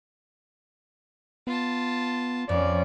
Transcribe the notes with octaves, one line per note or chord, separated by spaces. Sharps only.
B3 F4 A5
F2 C#4 D5